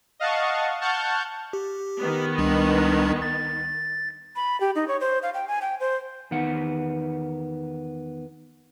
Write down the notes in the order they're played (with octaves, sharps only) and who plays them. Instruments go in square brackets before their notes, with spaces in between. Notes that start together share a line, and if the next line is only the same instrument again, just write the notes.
[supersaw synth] D#5 F5 F#5 A5 C#6
F#5 A5 C#6 F6 G6
[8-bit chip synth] G4
[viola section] D#3 B3
[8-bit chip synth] C#2 G3 D4
A6
[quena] B5
G4
D#4
C#5
C5
F5
G5
G#5
G5
C5
[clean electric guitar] E2 D#3 B3 F#5